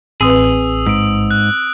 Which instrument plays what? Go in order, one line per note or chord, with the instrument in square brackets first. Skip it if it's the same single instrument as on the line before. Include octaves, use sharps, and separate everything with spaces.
[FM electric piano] A1 [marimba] C4 B4 [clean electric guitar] G#4 [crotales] D#6 E6
[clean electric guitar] G#2 [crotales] E6 D7
[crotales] F#6